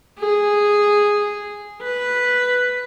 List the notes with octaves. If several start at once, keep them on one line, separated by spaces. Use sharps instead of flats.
G#4
B4